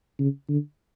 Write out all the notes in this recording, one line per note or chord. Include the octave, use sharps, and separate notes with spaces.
C#3
D3